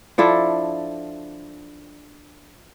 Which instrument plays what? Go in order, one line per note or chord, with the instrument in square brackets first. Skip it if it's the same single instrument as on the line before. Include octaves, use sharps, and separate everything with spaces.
[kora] F3 D4 E4 A4